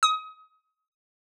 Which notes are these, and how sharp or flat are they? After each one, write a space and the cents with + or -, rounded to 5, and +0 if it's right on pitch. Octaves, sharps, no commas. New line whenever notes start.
D#6 +30